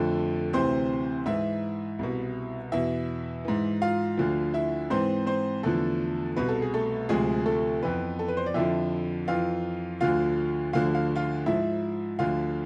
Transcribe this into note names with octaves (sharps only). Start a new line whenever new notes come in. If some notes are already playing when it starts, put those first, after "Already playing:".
Already playing: F2 D3 F3 A3 A4
D2 C3 E3 C4 C5
G#2 E3 E4 E5
C2 B2
E2 B2 E4 E5
G#2 E3
F4 F5
D2 D3 F3
E4 E5
G#2 E3 C4 C5
C4 C5
E2 D3 F3 A3 A4
C2 B2 B4
A4
G#4
A3 A4
D2 C3 F3 G#3 G#4
A3 A4
F2 E3 B3 B4
A4
B4
C5
D5
F2 D3 F3 E4 E5
F2 E3 F4 F5
D2 D3 F3 F4 F5
D2 D3 F3 F5
F5
F4 F5
G#2 F3 E4 E5
D2 D3 F3 F4 F5